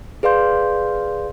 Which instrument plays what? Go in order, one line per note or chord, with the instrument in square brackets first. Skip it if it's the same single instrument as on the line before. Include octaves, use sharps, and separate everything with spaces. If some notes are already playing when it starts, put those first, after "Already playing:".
[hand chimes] G#4 B4 D5 F5 C6 G6